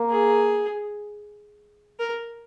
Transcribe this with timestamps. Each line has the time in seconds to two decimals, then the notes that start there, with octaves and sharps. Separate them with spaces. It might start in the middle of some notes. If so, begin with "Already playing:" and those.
Already playing: A#3
0.10 G#4
1.99 A#4